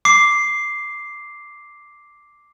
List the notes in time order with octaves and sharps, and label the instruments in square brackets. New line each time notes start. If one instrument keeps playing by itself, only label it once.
[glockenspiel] D6 C7